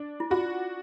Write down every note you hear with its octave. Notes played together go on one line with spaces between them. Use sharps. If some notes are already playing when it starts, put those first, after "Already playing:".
Already playing: D4
E4
F4 F#4